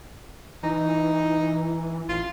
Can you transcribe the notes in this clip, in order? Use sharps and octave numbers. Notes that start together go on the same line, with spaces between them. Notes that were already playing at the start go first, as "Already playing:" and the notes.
E3 D#4
A1 F4